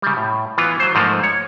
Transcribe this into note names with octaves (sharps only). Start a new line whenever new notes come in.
C#3 G3
A2
E3 B3 F4
F#3 C5
G#2 F3 A3 A#3
C#5